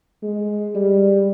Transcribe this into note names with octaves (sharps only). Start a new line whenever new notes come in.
G#3
G3